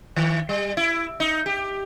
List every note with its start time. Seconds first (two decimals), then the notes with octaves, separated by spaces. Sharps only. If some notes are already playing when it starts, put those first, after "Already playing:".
0.16 D#3
0.49 G3
0.77 E4
1.20 D#4
1.46 G4